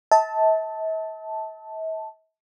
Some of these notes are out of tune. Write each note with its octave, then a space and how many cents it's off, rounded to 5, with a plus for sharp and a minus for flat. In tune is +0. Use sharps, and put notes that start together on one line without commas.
E5 -45 A5 +0